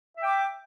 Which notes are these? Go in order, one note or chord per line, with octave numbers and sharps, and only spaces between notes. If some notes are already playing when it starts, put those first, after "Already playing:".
E5 G5 D6